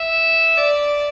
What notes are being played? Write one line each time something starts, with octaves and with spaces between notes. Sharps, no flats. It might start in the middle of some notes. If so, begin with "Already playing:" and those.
Already playing: E5
D5